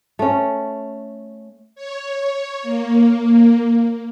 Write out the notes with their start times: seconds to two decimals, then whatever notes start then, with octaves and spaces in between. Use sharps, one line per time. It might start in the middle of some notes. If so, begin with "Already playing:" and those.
0.19 A3 C#4
1.75 C#5
2.63 A#3